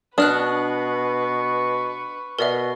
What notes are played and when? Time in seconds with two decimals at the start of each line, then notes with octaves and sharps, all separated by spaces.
0.18 B2 D4 B4 C#6 D#6 F6 F#6
2.39 B2 A#4 D5 E5